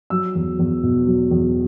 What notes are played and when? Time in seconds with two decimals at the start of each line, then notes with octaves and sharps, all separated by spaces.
0.10 F#3 E6
0.35 E2
0.59 E2
0.83 B2
1.07 F#3
1.31 E2